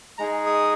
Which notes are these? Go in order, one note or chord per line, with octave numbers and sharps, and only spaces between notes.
G#3 D#4 G#4 A#5
D#6